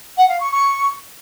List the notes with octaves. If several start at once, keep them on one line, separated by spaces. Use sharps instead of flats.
F#5
F5
C#6
C#6